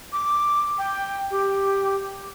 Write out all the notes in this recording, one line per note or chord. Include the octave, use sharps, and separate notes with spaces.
D6
G5
G4